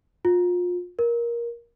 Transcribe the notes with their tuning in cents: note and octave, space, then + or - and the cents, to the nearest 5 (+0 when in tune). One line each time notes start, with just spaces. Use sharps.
F4 +30
A#4 +15